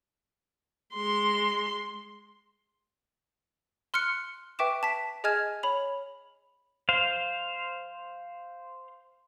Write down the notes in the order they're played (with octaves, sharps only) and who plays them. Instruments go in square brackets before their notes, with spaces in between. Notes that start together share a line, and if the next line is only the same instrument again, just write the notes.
[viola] G#3 C6
[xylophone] C6 F6 F#6 C#7
B4 E5 G5 C#6 D6 E7
A5 B6
G#4 D#5 G#5 F6 G#6 E7
C#5 B5 F7
[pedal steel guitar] C5 F5